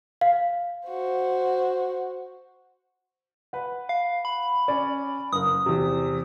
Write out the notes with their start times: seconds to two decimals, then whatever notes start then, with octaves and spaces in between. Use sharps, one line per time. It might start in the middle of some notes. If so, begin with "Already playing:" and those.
0.21 F5
0.87 F#4 C5
3.53 B4 F#5
3.89 F5
4.25 B5
4.68 C#4 D5
5.33 F#1 A#4 D#6
5.66 E2 C3